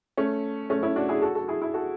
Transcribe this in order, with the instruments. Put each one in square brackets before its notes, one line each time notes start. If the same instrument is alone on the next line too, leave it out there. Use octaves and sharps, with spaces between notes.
[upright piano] A3 C#4
A3 C#4
C#4 E4
D4 F#4
E4 G#4
F#4 A4
F#4 A4
E4 G#4
E4 G#4
F#4 A4